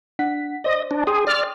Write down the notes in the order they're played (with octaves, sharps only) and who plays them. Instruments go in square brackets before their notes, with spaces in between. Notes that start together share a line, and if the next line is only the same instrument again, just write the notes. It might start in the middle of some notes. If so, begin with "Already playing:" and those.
[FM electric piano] D4 F#5 B6
[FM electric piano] C5 D5 [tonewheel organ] D#5
[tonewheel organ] D4
[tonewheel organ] G#4 [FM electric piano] G5 C6 D#6
[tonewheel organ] D5 F6